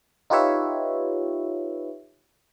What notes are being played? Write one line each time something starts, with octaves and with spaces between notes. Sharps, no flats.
D#4 F4 G4 B4 C#5 E5